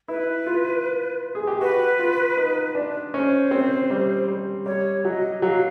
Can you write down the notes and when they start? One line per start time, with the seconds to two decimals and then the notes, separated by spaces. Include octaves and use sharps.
0.08 E4 B4
0.47 F4
1.35 G#4
1.47 G4
1.61 F#4 B4
1.99 F4
2.37 D#4
2.75 D4
3.14 C#4 C5
3.51 C4
3.90 G3
4.28 G3
4.66 G3 C#5
5.04 F#3 D#5 E5
5.42 F#3 F5